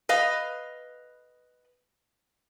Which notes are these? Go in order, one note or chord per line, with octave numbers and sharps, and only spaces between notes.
B4 D#5 F5